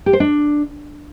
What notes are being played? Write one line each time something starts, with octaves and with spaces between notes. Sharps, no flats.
G4
C5
D4